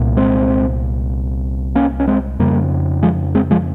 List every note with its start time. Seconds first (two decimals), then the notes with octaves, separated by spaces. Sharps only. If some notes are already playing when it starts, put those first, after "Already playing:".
Already playing: C2 A#2
0.17 G#3 C4
1.75 A#3 C#4
2.00 C#4
2.08 G#3 C4
2.40 F2 C#3 G3 A#3
3.03 F3 G#3
3.35 G#3 C4
3.51 F3 G#3